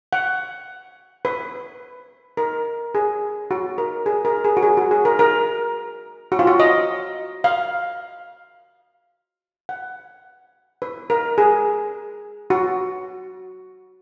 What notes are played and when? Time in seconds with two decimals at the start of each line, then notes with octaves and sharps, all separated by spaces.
0.13 F#5
1.25 B4
2.37 A#4
2.95 G#4
3.51 F#4
3.78 A#4
4.06 G#4
4.25 A#4
4.44 G#4
4.57 F#4
4.63 G#4
4.77 F#4
4.91 G#4
5.05 A#4
5.19 A#4
6.32 F#4
6.39 F4
6.47 F#4
6.60 D#5
7.44 F5
9.69 F#5
10.82 B4
11.10 A#4
11.38 G#4
12.50 F#4